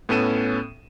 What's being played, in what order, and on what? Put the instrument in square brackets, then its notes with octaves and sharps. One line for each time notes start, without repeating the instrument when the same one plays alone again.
[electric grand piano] A2 B3 C#4 A4 D#7 E7